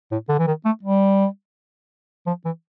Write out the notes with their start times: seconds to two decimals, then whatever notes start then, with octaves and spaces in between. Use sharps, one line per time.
0.11 A2
0.29 D3
0.39 E3
0.47 D#3
0.65 A3
0.83 G3
2.27 F3
2.45 E3